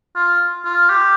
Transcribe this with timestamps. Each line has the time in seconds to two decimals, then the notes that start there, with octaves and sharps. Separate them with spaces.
0.16 F4
0.65 F4
0.90 G4